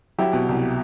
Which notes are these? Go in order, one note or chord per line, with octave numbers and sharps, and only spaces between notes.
F#3 E4 G4
B2
C2